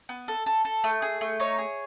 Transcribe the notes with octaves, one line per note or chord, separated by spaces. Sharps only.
B3
A4
A4
A4
A3
G#4
A3
D#4 C#5
G#4